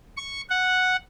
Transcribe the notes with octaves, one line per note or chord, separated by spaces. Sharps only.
C#6
F#5